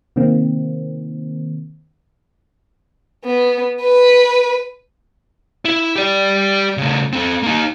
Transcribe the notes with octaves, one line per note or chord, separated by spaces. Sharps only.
C3 D#3 A#3 C4
B3
B4
E4
G4 D5
C#3 A3
C4 A4
A#3 D#4